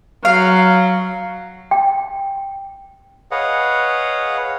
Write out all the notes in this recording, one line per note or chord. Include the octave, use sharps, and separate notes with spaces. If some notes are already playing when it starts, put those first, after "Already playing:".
F#3 F5
G5
G#4 B4 C#5 D#5 F5 F#5